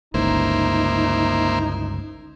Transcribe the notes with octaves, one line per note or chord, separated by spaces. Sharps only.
G1 C#2 A#3 D#4 E4 C5